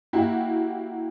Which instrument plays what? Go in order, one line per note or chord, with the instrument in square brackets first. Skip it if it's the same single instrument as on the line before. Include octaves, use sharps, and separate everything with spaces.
[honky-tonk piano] A#3 E4 F#4 G4